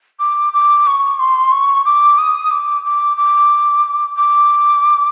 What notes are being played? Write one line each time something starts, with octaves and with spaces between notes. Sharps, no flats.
D6
D6
C#6
C6
C#6
D6
D#6
D6
D6
D6
D6